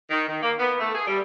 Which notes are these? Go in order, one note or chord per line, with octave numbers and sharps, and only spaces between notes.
D#3
D#3
A#3
B3
A3
G#4
G3